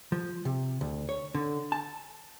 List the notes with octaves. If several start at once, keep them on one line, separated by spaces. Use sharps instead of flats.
F3
C3
D2
C#5
D3
A5